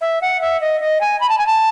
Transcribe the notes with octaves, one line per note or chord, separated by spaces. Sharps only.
E5
F#5
E5
D#5
D#5
G#5
B5
A5
G#5
A5